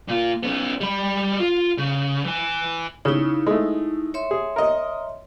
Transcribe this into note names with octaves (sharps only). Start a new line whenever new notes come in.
A#2 F4
B3 C#4
G3 B5
F4
C#3
E3 G#5
C#3 C#4 D#4 E4
G#3 A3
C#5 E5 C6
G#4
A#4 D#5